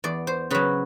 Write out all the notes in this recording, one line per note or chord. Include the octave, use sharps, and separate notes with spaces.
E2 D5
C5
C#3 F#3 B4